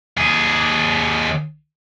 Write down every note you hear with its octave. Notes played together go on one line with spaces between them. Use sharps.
D#2 G#4